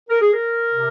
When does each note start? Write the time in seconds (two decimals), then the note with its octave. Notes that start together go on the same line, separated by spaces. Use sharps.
0.10 A#4
0.21 G#4
0.32 A#4
0.74 C3